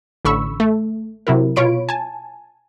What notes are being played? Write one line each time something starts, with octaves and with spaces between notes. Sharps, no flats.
A1 D3 B5 C#6 E6
A3
C3 F#3 E4 A#4
B2 F4 C#5 B5 D7
G#5 A5